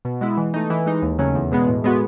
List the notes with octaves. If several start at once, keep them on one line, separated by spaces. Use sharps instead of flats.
B2
G#3 B3 E4
E3
A3 D#4
E3
G#3 D#4
D#2
C#3 F#3 A3 C#4
E2
B2 G#3 B3
A2
G#3 B3 F#4